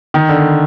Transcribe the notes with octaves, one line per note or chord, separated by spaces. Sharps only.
D#3
D3